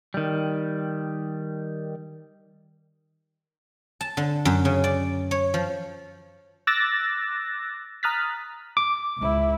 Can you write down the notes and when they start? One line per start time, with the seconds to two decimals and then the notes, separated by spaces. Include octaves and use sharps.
0.14 D#3 G3
4.01 A5
4.17 D3
4.45 F#2
4.65 C#3
4.84 D5
5.31 C#5
5.54 F3
6.67 D6 E6 F#6 A6 A#6
8.03 A#5 D#6 F6 F#6 A6 B6
8.77 D6
9.17 C#2 E4